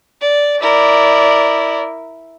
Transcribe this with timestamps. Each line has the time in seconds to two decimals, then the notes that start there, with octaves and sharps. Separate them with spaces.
0.21 D5
0.61 E4 A#4 D5